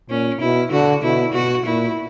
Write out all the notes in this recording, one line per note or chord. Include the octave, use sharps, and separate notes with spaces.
A#2 C#4
B2 E4
D3 F#4
B2 E4
B2 F#4
A#2 E4